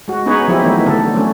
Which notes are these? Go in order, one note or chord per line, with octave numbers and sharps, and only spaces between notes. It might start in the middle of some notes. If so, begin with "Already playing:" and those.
G#3 F#4
B3 C#4 D#4 G#4 B4 C#5
F3 F#3 C4 E4 G4
D#3 E3 A3 B3 D#4
D3 A3 A4
F#3 A3 C#4